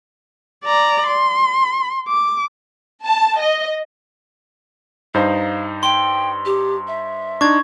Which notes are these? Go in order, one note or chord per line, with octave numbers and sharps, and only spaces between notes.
D5 A#5
C6
D6
A5
D#5
G2 D#4 C5 F5
G5 C6
G4
E5
D4 D#4 C#6 G#6